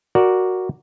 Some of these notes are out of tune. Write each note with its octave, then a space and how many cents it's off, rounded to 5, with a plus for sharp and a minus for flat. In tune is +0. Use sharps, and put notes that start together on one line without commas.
F#4 +0 A#4 +0 D5 +0